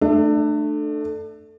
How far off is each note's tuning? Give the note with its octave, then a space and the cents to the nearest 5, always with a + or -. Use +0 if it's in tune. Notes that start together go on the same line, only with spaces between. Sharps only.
A3 +0 D4 +30 E5 +0